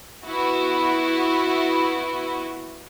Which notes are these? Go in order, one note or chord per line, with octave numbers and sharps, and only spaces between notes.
B3 E4 F#4